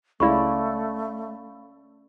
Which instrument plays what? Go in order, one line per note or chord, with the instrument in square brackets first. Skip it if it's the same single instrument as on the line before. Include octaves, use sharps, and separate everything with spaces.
[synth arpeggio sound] C#2 E4 [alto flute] A3 [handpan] C#4 D5 [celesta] F5 B5 C#6